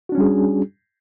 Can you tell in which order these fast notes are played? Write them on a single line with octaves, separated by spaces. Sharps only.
F#4 D4 C#4 G3 G#4